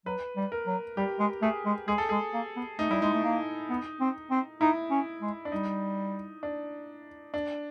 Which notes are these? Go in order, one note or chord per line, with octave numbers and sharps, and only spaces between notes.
F#3 B4
G3
A#4
F#3
G3 G4
G#3
A3 G#4
G#3
G#3 G#4
A4
G#3 G#4
A#3
B3
A3 D#4
G3 E4
G#3 D#4
A3
A#3
B3
C4
C4
D#4 E4
C#4
G#3
D4
G3 D#4
D4
D4